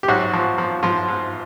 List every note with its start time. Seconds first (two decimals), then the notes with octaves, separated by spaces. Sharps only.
0.03 G4
0.08 G#2 F#3 F#4
0.34 F3
0.58 F3
0.83 G#2 F3 F4
1.08 G#2